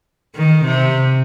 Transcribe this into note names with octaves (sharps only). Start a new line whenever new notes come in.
D#3
C3